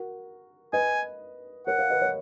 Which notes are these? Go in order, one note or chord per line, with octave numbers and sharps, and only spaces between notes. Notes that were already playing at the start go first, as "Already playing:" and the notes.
Already playing: F#4 A#4
B4 D#5 G#5
A#4 C#5 F#5
C#5 F5
B4 D#5
A#4 C#5